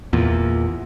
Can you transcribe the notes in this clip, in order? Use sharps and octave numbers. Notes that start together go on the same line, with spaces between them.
E2 A#2